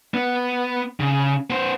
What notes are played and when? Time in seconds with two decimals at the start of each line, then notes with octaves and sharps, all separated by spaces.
0.14 B3
1.00 C#3
1.50 B3 C5